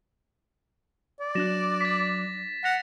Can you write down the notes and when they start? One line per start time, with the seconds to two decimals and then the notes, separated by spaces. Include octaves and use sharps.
1.20 D5
1.35 F#3 D4 F#6 A#6 E7
1.81 A6 B6
2.64 F#5 A#6 F7